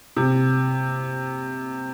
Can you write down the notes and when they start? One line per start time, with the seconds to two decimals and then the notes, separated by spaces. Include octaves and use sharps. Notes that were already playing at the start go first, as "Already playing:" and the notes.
0.17 C3